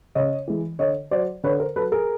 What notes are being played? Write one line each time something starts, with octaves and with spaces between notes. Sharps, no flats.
C#3 C#5 D#5
E3 G#3
D3 C#5 D#5
F#3 C5 D5
D3 B4 C#5
A#4 C5
F#3 A4 B4
G#4 A#4